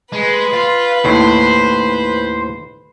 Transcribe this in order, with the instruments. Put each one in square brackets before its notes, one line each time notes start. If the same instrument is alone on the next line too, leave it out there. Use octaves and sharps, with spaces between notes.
[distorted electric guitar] G#3 [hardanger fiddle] B4
[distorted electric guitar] F4
[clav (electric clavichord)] D#2 A2 [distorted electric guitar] C5